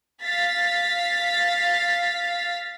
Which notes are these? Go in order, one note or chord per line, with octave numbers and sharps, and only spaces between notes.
F5 A6 B6